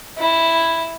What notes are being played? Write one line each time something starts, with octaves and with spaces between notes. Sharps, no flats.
E4